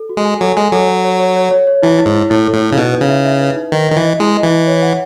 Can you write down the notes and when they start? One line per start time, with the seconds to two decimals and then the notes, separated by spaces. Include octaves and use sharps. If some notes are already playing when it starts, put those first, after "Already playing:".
Already playing: A4
0.09 F#4
0.17 G#3
0.25 G#5
0.41 F#3 A4
0.57 G#3 G#5
0.72 F#3 A4
0.88 C#5
1.04 C#5
1.20 C#5
1.36 C#5
1.51 C#5
1.67 C#5
1.82 E3 E4
1.99 E4
2.06 G#2
2.15 E4
2.30 A2 E4
2.45 A4
2.54 A2
2.62 E4
2.72 C#3
2.77 B2 D#4
2.93 B4
3.01 C#3
3.09 E5
3.25 E5
3.40 B4
3.56 D#4
3.72 D#3 B4
3.88 D#3 D#5
3.96 E3
4.03 D#5
4.19 G#3 E4
4.35 D#5
4.43 E3
4.51 E4
4.67 C#5
4.82 F#5